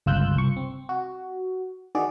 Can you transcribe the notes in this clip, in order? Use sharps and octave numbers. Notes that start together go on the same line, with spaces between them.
G1 C#2 F4 E6 F#6 G6
C2 C#6
C4
F#4
D#3 F#4 G#4 D5